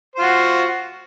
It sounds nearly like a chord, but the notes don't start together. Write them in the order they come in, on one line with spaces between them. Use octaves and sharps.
C5 F4 F#4